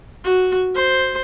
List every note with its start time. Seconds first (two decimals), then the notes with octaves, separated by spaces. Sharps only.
0.24 F#4
0.75 C5